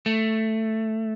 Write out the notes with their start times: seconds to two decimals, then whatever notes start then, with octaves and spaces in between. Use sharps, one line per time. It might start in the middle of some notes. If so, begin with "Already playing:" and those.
0.06 A3